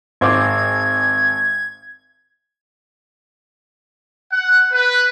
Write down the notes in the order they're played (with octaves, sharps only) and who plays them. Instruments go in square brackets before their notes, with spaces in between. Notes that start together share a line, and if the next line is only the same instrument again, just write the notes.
[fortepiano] G#1 C5 D6 [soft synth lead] G#6
[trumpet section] F#5
B4